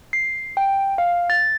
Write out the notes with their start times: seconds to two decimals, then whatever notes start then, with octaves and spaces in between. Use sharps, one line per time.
0.13 C7
0.57 G5
0.98 F5
1.30 A6